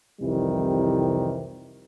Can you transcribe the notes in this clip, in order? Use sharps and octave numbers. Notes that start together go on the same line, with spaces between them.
C2 F2 C3 D#3 E3 G3